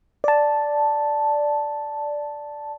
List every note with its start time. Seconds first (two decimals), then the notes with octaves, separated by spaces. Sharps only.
0.24 D5 A5